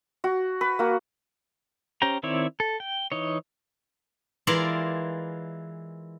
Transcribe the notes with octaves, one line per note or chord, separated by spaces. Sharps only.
F#4
B4
A#3 F#4
C#4 G4 C5 G5 A#5
D#3 C4 E4 C#5 D5
A4
G5
E3 D#4 C#5
E3 G#3 E4 F4 A#4 D5